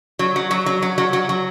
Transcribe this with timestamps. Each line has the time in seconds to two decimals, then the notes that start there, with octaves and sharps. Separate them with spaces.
0.19 F#3
0.36 F#3
0.51 F#3
0.66 F#3
0.82 F#3
0.98 F#3
1.13 F#3
1.29 F#3